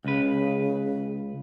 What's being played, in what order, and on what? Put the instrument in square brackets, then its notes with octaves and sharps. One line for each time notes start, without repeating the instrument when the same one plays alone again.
[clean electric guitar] C#2 B4 [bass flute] C#3